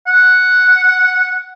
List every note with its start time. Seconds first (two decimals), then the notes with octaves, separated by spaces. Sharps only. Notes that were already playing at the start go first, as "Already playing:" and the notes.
0.07 F#5